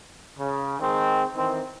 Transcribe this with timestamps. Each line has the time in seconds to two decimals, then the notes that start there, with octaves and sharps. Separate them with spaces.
0.38 C#3
0.80 D#3 G#3 C4
1.36 D#3 E3 C4